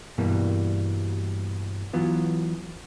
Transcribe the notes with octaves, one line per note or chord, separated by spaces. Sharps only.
G2 B2 E3 G3 A#3
E3 F#3 B3 F4